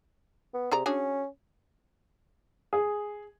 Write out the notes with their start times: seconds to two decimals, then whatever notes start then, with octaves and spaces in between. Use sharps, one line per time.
0.54 B3
0.71 C3 G#4 D5 A#5
0.86 C#4 D4 F#4 G#4
2.73 G#4